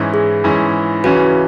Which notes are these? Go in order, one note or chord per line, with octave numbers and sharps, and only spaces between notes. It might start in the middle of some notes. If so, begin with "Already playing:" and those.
Already playing: G#2 E3 C#4 E4
G#4
G#2 E3 C#4 E4
C#2 C#3 E3 C#4 F#4 B4